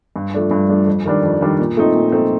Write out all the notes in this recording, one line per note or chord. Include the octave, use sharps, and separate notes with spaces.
G2
F3 A3 D4
G2
F3 A3 D4
F2
D#3 G3 D4
F2
D#3 G3 D4
A#2
F3 A3 C4 D#4
A#2
F3 A3 C4 D#4